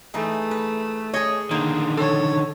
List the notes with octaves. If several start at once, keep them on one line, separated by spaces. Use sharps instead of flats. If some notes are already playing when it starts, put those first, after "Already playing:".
E3 A3 D#4 G#4
B4
G#4 C#5 D#5
D3 D#3 A#3 C5
A4 C#5